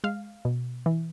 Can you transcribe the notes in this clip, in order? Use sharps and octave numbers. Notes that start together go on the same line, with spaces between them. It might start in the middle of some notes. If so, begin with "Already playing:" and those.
G#3 F5
B2
E3